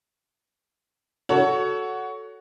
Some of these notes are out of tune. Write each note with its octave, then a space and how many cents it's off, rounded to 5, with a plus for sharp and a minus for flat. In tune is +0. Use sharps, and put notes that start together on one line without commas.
F#4 +0 A4 +0 C#5 +20